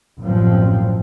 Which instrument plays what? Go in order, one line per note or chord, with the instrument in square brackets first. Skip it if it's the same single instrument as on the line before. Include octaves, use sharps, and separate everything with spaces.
[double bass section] A1 F#2 A#2 F3 C4